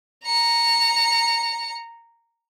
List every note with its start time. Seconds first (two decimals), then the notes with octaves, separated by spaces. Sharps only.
0.25 A#5 C#7